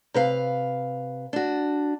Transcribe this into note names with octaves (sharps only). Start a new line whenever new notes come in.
C3 B4 F5
D4 F#4